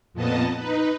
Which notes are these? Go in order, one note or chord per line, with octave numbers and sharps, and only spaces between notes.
F2 A#2 B3 D#5 A5
D#4 B4